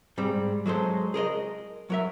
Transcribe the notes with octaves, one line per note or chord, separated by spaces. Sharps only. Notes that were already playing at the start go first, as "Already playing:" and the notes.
G#2 G3 C4
F#3 G#3 A4 C5
G#4 A#4 C5 D#5
F#3 A#4 E5